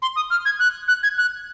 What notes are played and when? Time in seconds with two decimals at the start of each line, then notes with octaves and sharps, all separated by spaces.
0.02 C6
0.16 D#6
0.30 F6
0.45 G#6
0.59 F#6
0.88 F#6
1.03 G#6
1.17 F#6